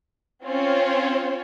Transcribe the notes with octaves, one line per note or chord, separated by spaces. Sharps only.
C4 C#4 F4 C#5